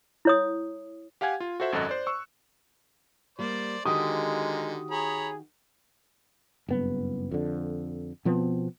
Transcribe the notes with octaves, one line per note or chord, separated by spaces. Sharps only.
E4 C#5 D#6
G4 F5 F#5 G#5 G#6
F4
F#4 A4 C5 E5 F#5
G#1 F#2 F#4 A4 D#5 F#6
C5 D5
C#6 E6
G3 A#3 C5 D5
D3 D#3 G#3 F#4 G4 A#4 D#6
G#4 C#5 A#5 B5
F#1 G2 B3
F2 D3
B2 F3 B3 C4